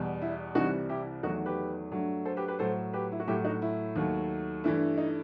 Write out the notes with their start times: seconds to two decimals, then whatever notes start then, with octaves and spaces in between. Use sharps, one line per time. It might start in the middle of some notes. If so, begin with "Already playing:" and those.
Already playing: E2 B2 G3
0.22 E4
0.55 C2 C3 E3 G3 D#4 F#4
0.89 E4 G4
1.23 E2 D#3 F#3 A3 D#4 F#4
1.46 G4 B4
1.91 G2 F#3 A3
2.25 A4 C5
2.37 G4 B4
2.48 G4 B4
2.59 A2 F#3 A3 A4 C5
2.93 G4 B4
3.12 E4
3.20 F#4
3.27 A2 F#3 A3 E4 G4
3.44 D#4 F#4
3.62 E4
3.96 D#2 D#3 F#3 A3
4.64 G2 E3 A3 E4
4.98 D#4